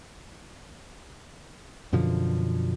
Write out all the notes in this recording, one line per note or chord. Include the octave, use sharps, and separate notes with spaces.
F#2 B2 D3 F3